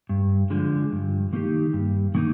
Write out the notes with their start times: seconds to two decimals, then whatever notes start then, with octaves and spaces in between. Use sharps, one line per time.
0.09 G2
0.50 D3 F3 G#3
0.92 G2
1.33 D#3 A#3 D#4 G4
1.73 G2
2.15 D#3 A#3 D#4